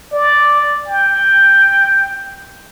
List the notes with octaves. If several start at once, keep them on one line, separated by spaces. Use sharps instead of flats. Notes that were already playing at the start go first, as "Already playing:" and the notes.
D5
G5